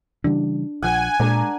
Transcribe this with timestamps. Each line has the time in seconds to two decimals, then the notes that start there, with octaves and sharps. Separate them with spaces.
0.24 C#3 E3 G3 D4
0.82 A#1 F3 F#5 G#5
1.20 A#2 G#3 D4 A#4